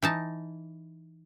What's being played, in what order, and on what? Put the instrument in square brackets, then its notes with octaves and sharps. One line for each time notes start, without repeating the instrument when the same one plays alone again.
[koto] E3 D#4 A5